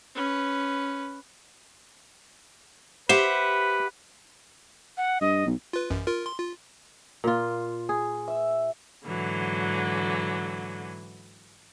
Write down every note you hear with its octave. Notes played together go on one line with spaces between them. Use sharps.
C#4 B4
G4 B4 C5 E5 F#5
F#5
G2 D#5
B1
F4 B4
A1 F#2
F4 A#4
C6
F4
A#2 F4
G#4
E5
G#2 D3 E3 F#3